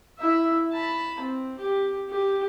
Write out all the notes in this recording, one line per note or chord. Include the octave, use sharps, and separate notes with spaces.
E4 E5
A5 B5
C4
G4
G4